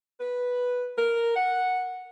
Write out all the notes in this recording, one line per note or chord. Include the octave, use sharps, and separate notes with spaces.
B4
A#4
F#5